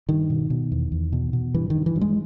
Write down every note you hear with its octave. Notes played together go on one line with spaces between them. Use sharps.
G2 D#3
B2
B2
E2
E2
B2
B2
G2 E3
D#3
G2
E3
G2
G#3